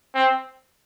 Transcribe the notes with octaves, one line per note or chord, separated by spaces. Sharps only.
C4